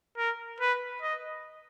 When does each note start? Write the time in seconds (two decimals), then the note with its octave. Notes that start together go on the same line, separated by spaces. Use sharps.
0.17 A#4
0.60 B4
1.02 D#5